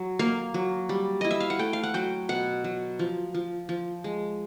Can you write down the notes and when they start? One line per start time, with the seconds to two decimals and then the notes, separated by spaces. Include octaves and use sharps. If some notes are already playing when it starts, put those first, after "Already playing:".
Already playing: F#3
0.19 A#3 F5
0.54 F#3
0.89 G3
1.21 E4 D#5
1.31 E5
1.40 F5
1.50 F#5
1.59 A3 G5
1.73 F5
1.83 F#5
1.94 F#3 G5
2.29 B2 F#5
2.64 F#3
2.99 F3
3.34 F3
3.69 F3
4.04 G#3